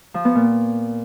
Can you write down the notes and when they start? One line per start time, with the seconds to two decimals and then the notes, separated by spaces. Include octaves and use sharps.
0.14 F3
0.25 B3
0.35 A#2